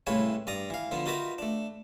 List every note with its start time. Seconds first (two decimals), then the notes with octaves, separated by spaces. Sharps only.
0.07 C2 A2 C#3 E4 B4 C#5
0.47 G2 D5 A#5 D#6
0.70 E3 F5
0.91 D3 F3 B3
1.06 D#4 F4 F#4 A#4 B4 E5
1.38 A3 D4